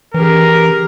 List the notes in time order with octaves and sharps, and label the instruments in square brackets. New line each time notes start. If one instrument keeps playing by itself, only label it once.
[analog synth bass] E3 [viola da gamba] C#4 G4 G#4 [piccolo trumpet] A#4